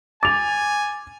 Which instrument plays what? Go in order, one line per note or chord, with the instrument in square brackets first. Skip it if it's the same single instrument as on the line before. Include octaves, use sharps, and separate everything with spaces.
[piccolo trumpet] G#5 [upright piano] D6 F7 [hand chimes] A6